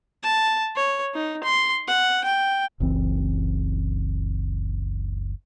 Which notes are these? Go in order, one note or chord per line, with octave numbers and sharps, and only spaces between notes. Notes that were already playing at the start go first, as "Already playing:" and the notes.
A5
C#5
D#4
C6
F#5
G5
F#1 C#2 E3 C4